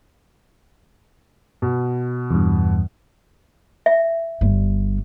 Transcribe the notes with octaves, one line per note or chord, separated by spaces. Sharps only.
B2
E2 G2
E5
G1 G3